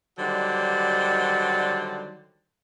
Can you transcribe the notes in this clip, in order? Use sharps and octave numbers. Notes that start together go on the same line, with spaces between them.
D3 D#3 F#3 G3 C5